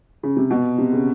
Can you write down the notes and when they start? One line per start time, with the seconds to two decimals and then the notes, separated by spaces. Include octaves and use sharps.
0.23 C#3
0.37 C3
0.50 B2
0.78 C3
0.93 C#3